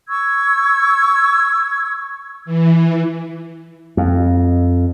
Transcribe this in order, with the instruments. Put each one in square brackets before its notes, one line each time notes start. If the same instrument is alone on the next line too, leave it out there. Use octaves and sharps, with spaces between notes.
[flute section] C#6 E6 G#6
[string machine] E3
[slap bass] F2